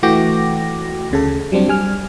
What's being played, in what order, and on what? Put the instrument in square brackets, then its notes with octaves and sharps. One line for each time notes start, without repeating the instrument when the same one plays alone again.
[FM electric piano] E3 A3 F#4 G5 D6 A#6
D2 C#3 A4
F#3 G3 C4 D4
G3 G#5 F6